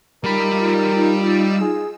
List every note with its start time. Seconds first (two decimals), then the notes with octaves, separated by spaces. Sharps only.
0.24 G3 D#4 F4 A#4 B5 E6
1.60 G#4